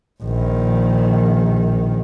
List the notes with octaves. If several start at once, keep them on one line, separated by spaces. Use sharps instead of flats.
A#1 D#3